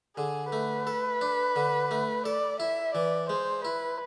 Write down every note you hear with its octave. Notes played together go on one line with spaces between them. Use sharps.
D3 G#4
A3 B4
A4
D4
D3
A3
A4 D5
E4 E5
E3 D5
G#3 C5
E4 B4